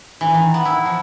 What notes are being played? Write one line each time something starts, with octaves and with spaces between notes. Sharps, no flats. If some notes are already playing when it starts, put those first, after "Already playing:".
E3
D#3
B3
E4
F3